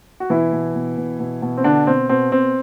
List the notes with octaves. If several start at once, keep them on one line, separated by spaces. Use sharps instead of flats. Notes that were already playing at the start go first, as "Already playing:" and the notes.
F#4
B2 E3 E4
B2
B2
B2
B2
B2
C4
B2 D3 D4
B2 C4
B2 C4
B2 C4